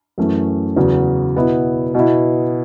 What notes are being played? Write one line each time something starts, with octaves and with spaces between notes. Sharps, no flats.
F#2 E3 A3 C#4
E2 C#3 F#3
B2 B3 E4
B2 B3 E4